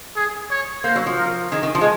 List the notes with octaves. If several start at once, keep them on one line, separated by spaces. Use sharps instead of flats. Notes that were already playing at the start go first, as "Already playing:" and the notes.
G#4
C#5
A#3 C5
F#3
F3
A#4
D#3 G#4
D#3
F3
G#3